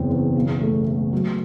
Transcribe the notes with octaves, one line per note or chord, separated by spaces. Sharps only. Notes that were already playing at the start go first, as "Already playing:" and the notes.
Already playing: F#1 E2 C4
E2
B1
A3
A3
F#3